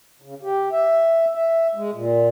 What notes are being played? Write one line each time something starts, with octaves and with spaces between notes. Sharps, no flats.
C#3
G4
E5
E5
G#3
A#2